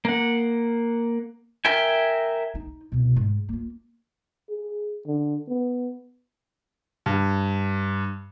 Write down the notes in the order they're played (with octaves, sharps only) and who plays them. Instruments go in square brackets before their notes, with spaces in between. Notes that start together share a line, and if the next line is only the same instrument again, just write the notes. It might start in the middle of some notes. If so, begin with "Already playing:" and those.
[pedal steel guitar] A#3 F#5
A#4 E5 G5 G#5
[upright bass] D#4
C2 B2
G#2
A#3 F4
[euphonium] G#4
D3
B3
[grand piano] G2